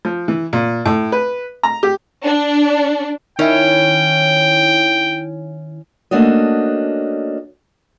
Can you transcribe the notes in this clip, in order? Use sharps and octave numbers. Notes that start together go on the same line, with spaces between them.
F3
E3
A#2
A2
B4
A#5
G4
D4
D#3 C#4 E4 C#5 G5
A3 A#3 C#4 D4 F#4 D#5